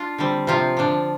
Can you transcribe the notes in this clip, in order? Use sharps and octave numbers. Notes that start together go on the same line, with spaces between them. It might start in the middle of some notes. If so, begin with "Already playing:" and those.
Already playing: D4 F4
D3 G3 C4
C3 F3 C4 F4
D3 F3 D4